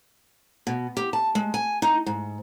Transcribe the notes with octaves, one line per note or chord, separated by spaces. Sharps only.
B2
G4
A5
G#3
G#5
D#4
G#2